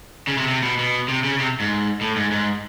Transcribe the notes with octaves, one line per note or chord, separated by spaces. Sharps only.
C#3
C3
C3
B2
B2
C3
C#3
C3
G#2
A2
G#2
G#2